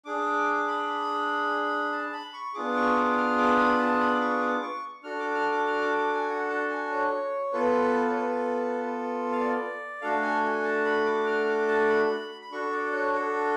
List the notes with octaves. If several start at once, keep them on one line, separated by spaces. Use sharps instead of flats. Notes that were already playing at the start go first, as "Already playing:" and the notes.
D4 G#4 D6
B5
A5
B5
C#6
B3 D4 F4 G#4 D6
C#6
D6
D6
F6
D6
B5
A5
B5
D6
C#6
D6
C#6
D4 F#4 A4 F6
D6
F6
D6
F6
D6
D6
G#5
F#5
A5
G#5
C#5
B3 F4 A4 B4
C#5
B4
F5
D5
A3 D4 F#4 A4 F5
G#5
G#5
A5
B5
D6
F6
D6
A5
B5
B5
D4 F#4 A4 C#6
D5
C#5
A4